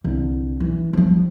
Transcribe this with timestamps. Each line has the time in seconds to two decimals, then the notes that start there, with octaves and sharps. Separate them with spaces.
0.04 C2 D3
0.60 E3
0.93 F3 G3